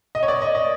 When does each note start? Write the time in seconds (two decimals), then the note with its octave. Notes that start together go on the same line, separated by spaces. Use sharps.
0.15 D#5
0.23 C#5
0.28 D5
0.42 D#5
0.55 D#5